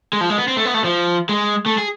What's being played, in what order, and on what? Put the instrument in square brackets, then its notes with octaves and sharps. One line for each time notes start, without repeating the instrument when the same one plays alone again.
[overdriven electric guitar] G#3
F3
G#3
B3
C4
A3
B3
A3
F3
G#3
A3
G#4